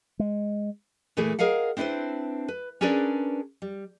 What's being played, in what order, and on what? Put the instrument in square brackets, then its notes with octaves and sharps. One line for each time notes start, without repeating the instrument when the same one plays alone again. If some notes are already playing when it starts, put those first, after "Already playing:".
[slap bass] G#3
[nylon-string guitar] A#2 E3 A3 E4 G#4
G#4 A#4 D#5 F5 F#5
C4 D4 E4 G4 B4 C5
B4
C#4 D4 G#4 A#4 B4 D5
G3